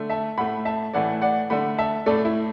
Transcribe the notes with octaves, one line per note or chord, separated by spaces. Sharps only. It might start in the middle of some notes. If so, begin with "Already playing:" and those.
Already playing: D3 A3
E5 A5
A2 A3 F#5 B5
E5 A5
A2 E3 A3 D5 F#5
D5 F#5
D3 A3 F#5 B5
E5 A5
A2 A3 A4 D5
E4